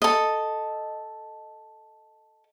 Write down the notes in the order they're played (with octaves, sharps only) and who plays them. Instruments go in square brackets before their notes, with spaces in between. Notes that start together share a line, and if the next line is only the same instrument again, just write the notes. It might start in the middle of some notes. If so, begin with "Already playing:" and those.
[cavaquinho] A4 D#5